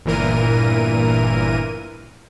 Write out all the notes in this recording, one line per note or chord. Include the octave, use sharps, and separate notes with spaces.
G1 A#2 E3 A#4 D#7